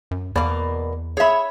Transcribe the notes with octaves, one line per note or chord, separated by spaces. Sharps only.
F#2
E2 B2 A#3 D5
G#4 C#5 E5 B5